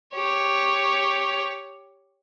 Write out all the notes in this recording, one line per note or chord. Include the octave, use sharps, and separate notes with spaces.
G4 C#5